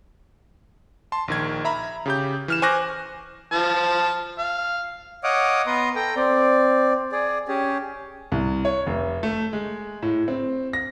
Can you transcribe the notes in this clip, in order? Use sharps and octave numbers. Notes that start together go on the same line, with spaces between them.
A5 C6
A#1 D#3 G#6
E5 A#5 B5
C#3 G4 G6
E3 F6 E7
C5 G#5 C#6 D6 F#6 A#6
F3 A5
F5
C#5 D#5 F5 F#5 D6 D#6
B3 B4 A#5 C6
A4 G5 A#5
C4 D5
G#4 D5
C#4 G4 G#4
C2
C#5
F1
A3
G#3
A2
C4
A#6